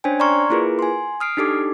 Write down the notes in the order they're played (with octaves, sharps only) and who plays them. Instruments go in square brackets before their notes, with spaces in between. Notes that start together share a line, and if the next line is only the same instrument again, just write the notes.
[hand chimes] C#4 D4 C5 C#5 G5 G#5
D5 A#5 C6 C#6 F6 G#6
A#3 E4 F4 G#4 A#4 B4
G#5 C6
D#6 F6 C7 D7
D4 D#4 G4 A4 D6